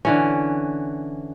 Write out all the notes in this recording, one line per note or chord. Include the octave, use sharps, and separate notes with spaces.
D3 E3 C#4